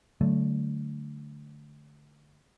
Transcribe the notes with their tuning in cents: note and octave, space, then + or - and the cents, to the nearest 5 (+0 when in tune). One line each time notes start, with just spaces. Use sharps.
D3 +0 F#3 +30 A3 +0